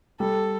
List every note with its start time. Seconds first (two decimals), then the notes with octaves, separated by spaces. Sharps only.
0.20 G3 A4